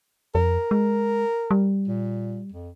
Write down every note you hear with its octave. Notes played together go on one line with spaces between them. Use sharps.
F2 A#4
G#3
G3
A#2
F2